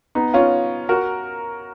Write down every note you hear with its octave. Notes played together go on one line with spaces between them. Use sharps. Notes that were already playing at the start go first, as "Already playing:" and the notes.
B3 D#4
C#4 F4
F#4 A#4